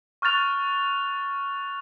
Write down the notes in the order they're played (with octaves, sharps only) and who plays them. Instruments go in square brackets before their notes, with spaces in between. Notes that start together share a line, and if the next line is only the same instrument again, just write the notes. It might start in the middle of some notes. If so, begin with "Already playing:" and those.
[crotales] C#6 F6 F#6 A6 F7